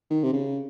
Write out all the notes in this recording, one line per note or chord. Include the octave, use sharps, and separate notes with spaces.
D#3
C3
C#3